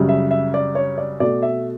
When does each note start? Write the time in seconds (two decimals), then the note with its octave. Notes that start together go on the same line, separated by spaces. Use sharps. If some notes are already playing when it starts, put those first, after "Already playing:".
Already playing: F#2 C#3 G3
0.09 E5
0.31 E5
0.54 D5
0.75 C#5
0.98 D5
1.20 B2 A3 D5
1.42 E5